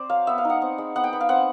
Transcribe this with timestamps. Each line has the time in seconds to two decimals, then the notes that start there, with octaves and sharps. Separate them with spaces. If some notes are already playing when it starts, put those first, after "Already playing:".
Already playing: C4 C5 D5
0.10 F#3 F5
0.27 B3 E5
0.38 F5
0.45 D#4 F#5
0.62 C4
0.78 G#3
0.96 B3 F#5
1.04 G5
1.13 B3
1.21 F5
1.29 C4 F#5